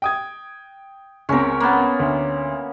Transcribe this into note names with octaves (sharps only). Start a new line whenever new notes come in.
G5 D#6 G#6
C#2 C4 C#4 A#4
A#3 B3
D2